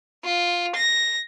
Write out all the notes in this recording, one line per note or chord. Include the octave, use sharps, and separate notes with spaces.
F4
A#6